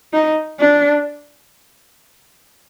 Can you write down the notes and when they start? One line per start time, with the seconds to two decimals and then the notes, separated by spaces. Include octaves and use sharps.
0.13 D#4
0.59 D4